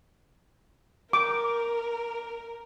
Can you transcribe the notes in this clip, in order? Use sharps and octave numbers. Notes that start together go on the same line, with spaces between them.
A#4 D6